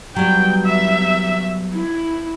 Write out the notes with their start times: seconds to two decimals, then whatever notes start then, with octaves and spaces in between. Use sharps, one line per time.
0.16 F#3 G3 B3 G5
0.65 E5
1.74 E4